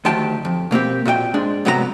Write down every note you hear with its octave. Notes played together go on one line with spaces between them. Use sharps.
D2 D#3 F#3 G4 A5
F2
B2 A#3 C4 G4
A#2 F#4 D#5 G5
G#2 G#3 D4
G#2 C3 F#3 B3 A#4 A#5